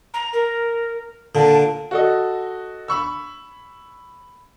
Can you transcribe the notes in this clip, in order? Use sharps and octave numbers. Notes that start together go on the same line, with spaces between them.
A#5
A#4
A#2 D3 A5
F#4 A4 D#5
B5 C#6 E6